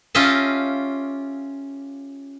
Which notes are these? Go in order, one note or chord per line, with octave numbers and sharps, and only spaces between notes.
C#4 F4 G4 D#5 E5 A5